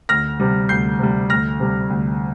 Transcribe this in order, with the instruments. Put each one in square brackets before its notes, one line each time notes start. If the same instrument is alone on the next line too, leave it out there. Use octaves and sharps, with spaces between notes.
[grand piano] D2 F6 A#6
C3 G3
D2 G6 C7
C3 G3
D2 F6 A#6
C3 G3
D2